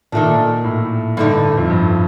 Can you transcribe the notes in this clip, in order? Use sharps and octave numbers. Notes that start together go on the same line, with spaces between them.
A#2 D#3 A3 D4
A2
G2 D3 A3 D#4
F2
G2